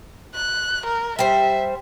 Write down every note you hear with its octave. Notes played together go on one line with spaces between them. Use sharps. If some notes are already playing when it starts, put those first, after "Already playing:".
F#6
A#4
G3 C5 E5